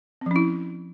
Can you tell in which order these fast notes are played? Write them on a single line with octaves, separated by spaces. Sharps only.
C4 F3 C#4 E4